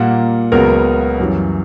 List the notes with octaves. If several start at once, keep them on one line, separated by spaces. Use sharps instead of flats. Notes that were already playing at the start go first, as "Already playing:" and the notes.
Already playing: A#2 G3 A#3 F#5
C#2 C#3 F#3 B3 A#4
F#2 E3 G3